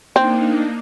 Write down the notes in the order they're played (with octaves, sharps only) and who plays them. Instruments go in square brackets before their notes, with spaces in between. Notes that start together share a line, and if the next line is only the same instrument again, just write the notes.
[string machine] A#3 D4 D#4 [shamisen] C4